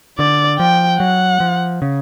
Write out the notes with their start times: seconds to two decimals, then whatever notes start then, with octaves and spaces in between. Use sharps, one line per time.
0.19 D3 D5
0.59 F3 G5
1.00 F#3 F#5
1.40 F3
1.82 C#3